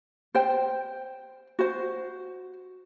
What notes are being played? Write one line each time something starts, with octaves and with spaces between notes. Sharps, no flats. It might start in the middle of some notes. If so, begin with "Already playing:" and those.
C5 G5
F#4 C5